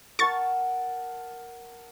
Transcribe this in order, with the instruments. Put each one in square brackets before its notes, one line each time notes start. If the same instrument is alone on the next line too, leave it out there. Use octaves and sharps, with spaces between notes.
[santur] A#4 F#5 A5 [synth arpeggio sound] C#6 A6